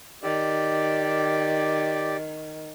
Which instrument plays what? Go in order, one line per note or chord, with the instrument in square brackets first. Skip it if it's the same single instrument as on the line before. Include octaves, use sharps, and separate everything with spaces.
[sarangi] D#3 [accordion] G4 D5